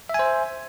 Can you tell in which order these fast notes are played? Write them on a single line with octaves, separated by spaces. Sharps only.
E5 G#5 C5